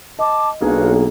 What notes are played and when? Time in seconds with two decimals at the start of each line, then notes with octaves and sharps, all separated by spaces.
0.19 D#5 A5 D6
0.61 B1 A#3 D4 F4 F#4 G#4